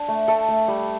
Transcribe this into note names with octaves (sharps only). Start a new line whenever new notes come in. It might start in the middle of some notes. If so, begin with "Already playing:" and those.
Already playing: D4
A3
A3 A4
A3
G3